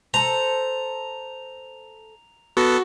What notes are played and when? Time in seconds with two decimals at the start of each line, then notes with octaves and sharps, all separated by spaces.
0.14 A4 C5 A#5
2.57 B3 F#4 A4